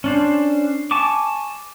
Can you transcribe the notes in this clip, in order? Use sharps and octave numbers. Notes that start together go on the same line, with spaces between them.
C#4 D4 C5
G#5 A5 C#6 D6